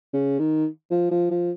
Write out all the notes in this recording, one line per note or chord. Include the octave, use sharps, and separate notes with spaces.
C#3
D#3
F3
F3
F3